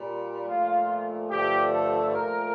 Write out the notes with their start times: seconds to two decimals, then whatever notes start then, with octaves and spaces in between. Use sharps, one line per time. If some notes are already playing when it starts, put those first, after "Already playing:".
Already playing: A#2 G3
0.47 A#2 F3 A3 F4
1.30 G2 D3 F3 A3 G4
1.72 A4
2.14 A#2 F3 A3 A#4